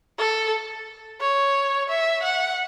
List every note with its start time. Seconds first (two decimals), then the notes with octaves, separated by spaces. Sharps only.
0.19 A4
1.21 C#5
1.89 E5
2.23 F#5